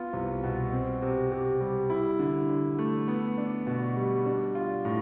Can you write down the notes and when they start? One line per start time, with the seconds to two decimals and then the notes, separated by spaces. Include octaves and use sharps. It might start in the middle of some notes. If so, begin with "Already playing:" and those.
Already playing: B3 F4
0.13 C2
0.43 B2
0.72 C4
1.02 C3
1.32 C3
1.61 G3
1.90 E4
2.19 D3
2.49 D3
2.79 A3
3.08 B3
3.38 D4
3.67 B2
3.96 G3
4.26 D4
4.55 F4
4.85 A2